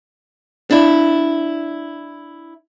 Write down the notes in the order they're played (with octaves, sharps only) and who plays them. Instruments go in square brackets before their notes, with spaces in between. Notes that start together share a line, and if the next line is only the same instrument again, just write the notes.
[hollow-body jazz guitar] D4 E4